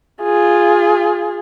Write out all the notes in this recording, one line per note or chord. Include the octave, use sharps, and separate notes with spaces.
F4 G#4